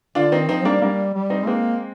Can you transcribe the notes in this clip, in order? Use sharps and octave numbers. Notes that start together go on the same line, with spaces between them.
D3 D4 F4
D#3 C4 D#4
F3 C4 D#4
G3 A#3 D4
G3 A#3 D4
G3
C4 D#4
G#3 A#3 C4